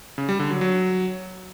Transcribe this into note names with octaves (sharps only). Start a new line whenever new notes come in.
C#3
G3
D3
F#3
F#3